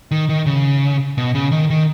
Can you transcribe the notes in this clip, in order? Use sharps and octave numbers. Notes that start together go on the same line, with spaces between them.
D#3
D#3
C#3
B2
C#3
D#3
D#3